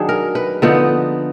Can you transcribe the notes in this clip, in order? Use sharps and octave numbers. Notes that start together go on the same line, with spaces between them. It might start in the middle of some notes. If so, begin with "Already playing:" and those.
Already playing: D#3 F#3 D4 G#4
A#4
B4
D3 F3 B3 D#4 B4